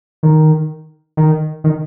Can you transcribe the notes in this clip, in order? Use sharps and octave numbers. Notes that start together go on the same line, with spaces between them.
D#3
D#3
D#3